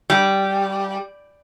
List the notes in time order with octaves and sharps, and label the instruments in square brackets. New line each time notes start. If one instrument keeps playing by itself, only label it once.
[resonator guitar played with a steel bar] G3